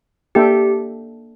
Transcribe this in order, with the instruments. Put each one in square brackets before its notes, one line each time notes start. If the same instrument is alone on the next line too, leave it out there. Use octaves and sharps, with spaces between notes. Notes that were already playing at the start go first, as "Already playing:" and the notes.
[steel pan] A#3 D4 A4 E5 G5 [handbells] G4